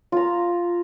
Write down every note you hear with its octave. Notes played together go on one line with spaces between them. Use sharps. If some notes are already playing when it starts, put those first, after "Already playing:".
F4 A#5